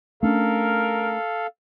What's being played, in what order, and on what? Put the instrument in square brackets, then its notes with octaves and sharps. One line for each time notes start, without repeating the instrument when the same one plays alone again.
[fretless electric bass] A3 C#4 D4 [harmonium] A4 F5 [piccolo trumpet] A#4